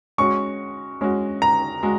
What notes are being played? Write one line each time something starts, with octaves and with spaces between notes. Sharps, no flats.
G#3 C#4 F#4 C#6
G#3 C#4 F#4
A#5
G#3 F#4